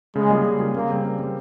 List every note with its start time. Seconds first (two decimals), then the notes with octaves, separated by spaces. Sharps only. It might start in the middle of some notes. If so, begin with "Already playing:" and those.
0.15 C#3 G#3
0.30 G3 A#3 F4 G#4
0.45 C#3
0.59 G3 A#3 F4 G#4
0.74 C#3 A#3
0.90 G3 C4
1.05 C#3
1.19 G3 C4